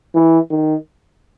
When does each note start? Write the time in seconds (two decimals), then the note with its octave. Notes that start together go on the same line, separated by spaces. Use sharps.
0.15 E3
0.50 D#3